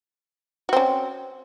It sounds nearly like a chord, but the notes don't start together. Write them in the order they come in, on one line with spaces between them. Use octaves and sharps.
F#4 C4 C#4